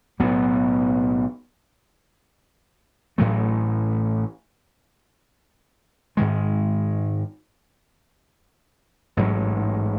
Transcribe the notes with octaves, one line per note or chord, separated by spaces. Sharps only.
B1 A2 F#3 B3
A1 A2 F#3 A3
G#2 D#3 G#3
A1 G#2 F#3